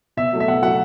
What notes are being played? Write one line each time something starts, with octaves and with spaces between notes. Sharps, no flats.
B2 E5
F#3 A3
E5
B2 F#5
F#3 A3 F#5